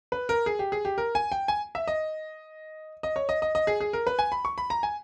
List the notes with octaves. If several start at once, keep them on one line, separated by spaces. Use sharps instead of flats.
B4
A#4
G#4
G4
G#4
G4
A#4
G#5
G5
G#5
E5
D#5
D#5
C#5
D#5
D#5
D#5
G#4
G#4
A#4
B4
G#5
B5
C#6
B5
A#5
G#5